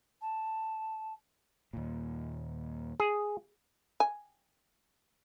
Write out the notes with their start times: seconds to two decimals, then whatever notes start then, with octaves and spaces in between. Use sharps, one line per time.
0.21 A5
1.73 D#2 A#2
3.00 G#4
4.00 G#5